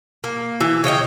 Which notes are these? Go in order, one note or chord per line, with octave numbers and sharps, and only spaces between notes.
A#3
E3
C#3 C#5 D#5 G5